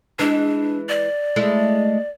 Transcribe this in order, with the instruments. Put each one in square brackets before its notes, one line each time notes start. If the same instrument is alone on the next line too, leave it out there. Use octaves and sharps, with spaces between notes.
[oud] E3 G#3 [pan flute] D4
[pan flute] D5
[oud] G#3 A3 E4